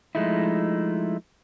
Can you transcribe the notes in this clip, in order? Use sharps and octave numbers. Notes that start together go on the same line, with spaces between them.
F3 G#3 A3 D#4 E4